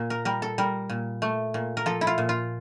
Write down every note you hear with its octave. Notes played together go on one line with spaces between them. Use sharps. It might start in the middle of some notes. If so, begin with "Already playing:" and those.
Already playing: A#2
A#4
G3 A#4
A4
G3 A#4
A#2
A3
A#2
A#4
F3 A4
E4
F4
A#2
F4